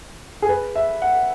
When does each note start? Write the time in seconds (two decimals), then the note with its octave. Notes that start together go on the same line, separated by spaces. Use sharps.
0.42 G#4
0.49 B4
0.75 E5
1.02 F#5